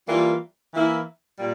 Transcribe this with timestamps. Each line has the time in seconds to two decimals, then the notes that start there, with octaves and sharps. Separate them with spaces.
0.08 E3 G3 A#3 F4
0.73 E3 A#3 E4
1.39 A#2 G3